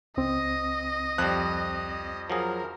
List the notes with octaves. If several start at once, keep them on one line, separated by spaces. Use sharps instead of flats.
C#2 C4 D#5
F2 F3 G3 F#6
F3 F#3 G#4 A#4